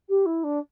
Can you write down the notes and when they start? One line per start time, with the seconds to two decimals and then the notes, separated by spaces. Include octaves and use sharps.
0.09 G4
0.26 E4
0.44 D4